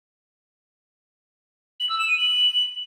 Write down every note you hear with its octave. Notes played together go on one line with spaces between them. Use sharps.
F#7
E6
E7
D#7
F#7